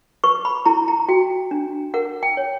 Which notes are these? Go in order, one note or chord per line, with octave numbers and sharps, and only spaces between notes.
B4 C#6
B5
E4 A#5
A#5
F#4 G5
D4
A#4 F#5
G5
C#5